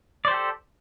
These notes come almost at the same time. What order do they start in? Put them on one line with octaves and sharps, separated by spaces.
D5 C5 G4 A4